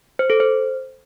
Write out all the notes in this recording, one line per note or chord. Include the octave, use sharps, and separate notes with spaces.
C5
A4
C5